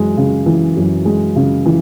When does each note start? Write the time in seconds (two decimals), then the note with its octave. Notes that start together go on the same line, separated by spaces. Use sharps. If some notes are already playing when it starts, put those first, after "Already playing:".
Already playing: F#2 E3 G#3
0.17 C#3
0.46 E3
0.77 F#2
1.05 G#3
1.36 C#3
1.66 E3